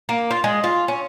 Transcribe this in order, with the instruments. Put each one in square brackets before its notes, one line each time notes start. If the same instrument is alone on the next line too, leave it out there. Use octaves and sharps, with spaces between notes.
[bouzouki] A#3
F4
G#3
F4
C#4